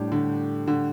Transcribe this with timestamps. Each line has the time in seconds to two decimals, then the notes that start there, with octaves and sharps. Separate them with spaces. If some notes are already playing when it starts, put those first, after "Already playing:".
Already playing: A2 G3 D4 G4
0.12 D3
0.67 D3